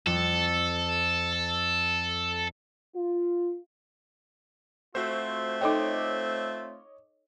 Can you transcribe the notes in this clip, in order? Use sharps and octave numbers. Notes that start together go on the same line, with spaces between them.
F2 A4
F4
A3 C4 F4 F#4 C5
D#4 A4 C#5 D#5 G5 D6